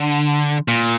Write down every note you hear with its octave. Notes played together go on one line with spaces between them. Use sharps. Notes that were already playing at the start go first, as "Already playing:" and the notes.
Already playing: D3
A#2